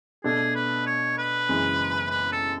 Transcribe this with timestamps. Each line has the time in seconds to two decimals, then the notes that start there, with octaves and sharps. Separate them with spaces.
0.24 B2 A3 D4 G#4 A4
0.55 B4
0.86 C#5
1.18 B4
1.49 F#1 F#2 C#3 E3 G#3
2.11 B4
2.32 A4